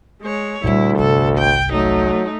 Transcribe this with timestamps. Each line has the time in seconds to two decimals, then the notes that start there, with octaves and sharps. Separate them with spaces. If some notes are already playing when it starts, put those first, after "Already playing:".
0.22 G#3 C#5
0.64 D2 A#2 G3 E4
0.98 G1 C2 A4
1.38 G5
1.71 F#3 A3 D#4